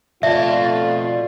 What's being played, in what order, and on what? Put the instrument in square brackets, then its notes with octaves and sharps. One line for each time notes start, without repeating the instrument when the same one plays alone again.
[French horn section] F2 A3 F4 [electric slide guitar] B2 A5 [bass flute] D5 [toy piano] E5